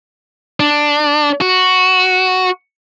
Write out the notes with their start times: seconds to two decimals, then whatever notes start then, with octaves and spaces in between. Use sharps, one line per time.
0.60 D4
1.41 F#4